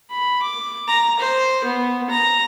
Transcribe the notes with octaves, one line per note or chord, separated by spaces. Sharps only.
B5
D6
A#5
C5
B3
A#5